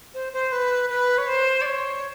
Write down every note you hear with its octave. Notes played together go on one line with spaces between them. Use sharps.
C5
C5
B4
B4
C#5
C5
D5
C#5